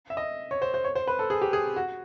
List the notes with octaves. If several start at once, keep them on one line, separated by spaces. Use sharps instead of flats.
E5
D#5
C#5
C5
C5
C#5
C5
B4
A4
G#4
G4
G#4
F#4